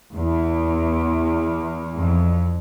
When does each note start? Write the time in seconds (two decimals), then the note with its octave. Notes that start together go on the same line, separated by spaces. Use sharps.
0.14 E2
1.95 F2